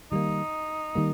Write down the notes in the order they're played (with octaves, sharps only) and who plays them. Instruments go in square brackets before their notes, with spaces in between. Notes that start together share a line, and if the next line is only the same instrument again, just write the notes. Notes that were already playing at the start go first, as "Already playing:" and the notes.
[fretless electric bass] D#3 G3 A#3 [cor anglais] D#4
[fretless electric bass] D#3 G3 A#3